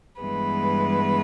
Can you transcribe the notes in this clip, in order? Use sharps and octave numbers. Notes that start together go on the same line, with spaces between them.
G2 E3 G#3 B3 B4